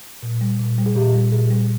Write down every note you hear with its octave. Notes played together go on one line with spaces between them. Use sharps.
A#2
G3
A#2
G3
G#4
A#2 G4
G3
A#2 G#4
G3